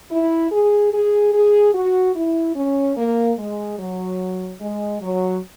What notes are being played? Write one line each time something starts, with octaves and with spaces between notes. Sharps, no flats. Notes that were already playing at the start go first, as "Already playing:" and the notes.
E4
G#4
G#4
G#4
F#4
E4
C#4
A#3
G#3
F#3
G#3
F#3